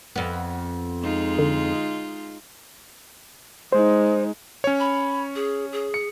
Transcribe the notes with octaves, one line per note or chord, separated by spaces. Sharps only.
F2 B3
G#3 D#4 F4
D3
G#3 D#4 C5
C#4 C#5
B5
G#4
G#4
C#7